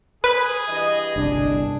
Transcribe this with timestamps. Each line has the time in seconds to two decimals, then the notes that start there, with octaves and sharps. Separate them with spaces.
0.24 G#4 B4
0.68 G2 E3 D#5
1.16 G1 C2 D4